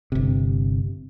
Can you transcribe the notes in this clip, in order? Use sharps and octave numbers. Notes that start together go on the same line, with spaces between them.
G1 C3